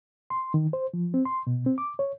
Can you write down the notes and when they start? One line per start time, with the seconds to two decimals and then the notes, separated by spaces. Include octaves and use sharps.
0.30 C6
0.54 D#3
0.73 C5
0.94 F3
1.14 C4
1.25 C6
1.47 B2
1.66 C4
1.78 D6
1.99 C#5